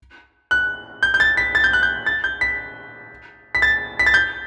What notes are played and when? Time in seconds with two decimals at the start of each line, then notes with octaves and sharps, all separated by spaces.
0.51 F#6
1.03 G6
1.14 G6
1.20 A6
1.37 B6
1.55 A6
1.64 G6
1.73 F#6
1.83 G6
2.06 A6
2.24 G6
2.41 B6
3.55 B6
3.62 A6
3.99 B6
4.06 A6
4.14 G6